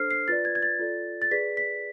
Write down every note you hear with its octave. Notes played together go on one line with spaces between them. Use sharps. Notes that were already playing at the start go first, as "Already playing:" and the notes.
Already playing: D4 A4 C5 F6 C7
C7
F4 B4 D5 A6
G#6
G#6
A6
F4 A4 D5
A6
G#4 B4 D5 B6
B6